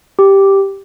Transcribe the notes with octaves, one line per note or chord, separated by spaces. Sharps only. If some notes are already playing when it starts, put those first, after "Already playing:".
G4